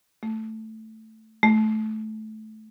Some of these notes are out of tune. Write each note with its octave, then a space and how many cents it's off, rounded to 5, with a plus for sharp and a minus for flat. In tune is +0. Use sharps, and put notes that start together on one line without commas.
A3 +5
A3 -20